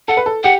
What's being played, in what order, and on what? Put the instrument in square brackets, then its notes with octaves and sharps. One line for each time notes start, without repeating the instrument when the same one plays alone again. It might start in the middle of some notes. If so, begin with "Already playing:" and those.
[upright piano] A4 [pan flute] F#5
[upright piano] B4
A4
[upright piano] G4 [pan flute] F#5